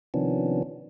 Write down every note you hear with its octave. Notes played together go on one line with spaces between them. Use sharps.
C3 D#3 F3 B3 C#4 D4